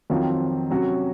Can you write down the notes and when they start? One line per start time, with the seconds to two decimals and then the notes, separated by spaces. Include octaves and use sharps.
0.10 F2 D#3 F#3 C4 F4
0.70 C3 F#3 C#4 F#4